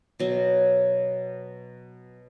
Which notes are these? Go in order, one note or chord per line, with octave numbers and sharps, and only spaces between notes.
B2 F#3